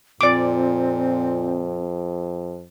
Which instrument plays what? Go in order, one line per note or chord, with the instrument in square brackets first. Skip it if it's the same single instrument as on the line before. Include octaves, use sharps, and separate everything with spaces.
[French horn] F2 [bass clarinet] A#2 [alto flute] C4 [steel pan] D5 D6